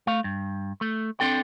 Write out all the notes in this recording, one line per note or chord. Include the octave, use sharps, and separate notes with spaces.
A3 F5
G2
A3
C4 D4 A4 G5